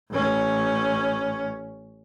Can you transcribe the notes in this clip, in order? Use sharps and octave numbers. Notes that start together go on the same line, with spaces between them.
A1 C#4